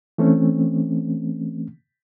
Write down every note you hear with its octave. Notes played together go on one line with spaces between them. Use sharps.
E3 A3 C4 C#4